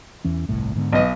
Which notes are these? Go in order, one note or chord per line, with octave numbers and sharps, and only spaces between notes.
E2 E3 C#4
G1 C2 A2
G#2 D3 B3
B1 D#5